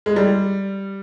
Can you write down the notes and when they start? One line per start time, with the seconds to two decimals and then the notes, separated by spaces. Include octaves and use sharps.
0.06 G#3
0.16 G3